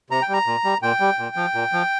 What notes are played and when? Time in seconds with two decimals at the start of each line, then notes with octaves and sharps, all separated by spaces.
0.10 C3 A#5
0.22 G5
0.29 G3 A#5
0.46 A#2
0.64 G3
0.82 A#2 G5
1.00 G3
1.19 A#2
1.36 F3
1.54 A#2
1.73 F3